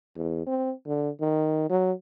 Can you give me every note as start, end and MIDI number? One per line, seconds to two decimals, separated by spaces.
0.16 0.42 40
0.47 0.72 60
0.87 1.10 50
1.21 1.65 51
1.69 1.92 54